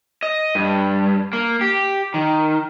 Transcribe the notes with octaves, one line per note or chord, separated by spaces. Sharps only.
D#5
G2
A#3
G4
D#3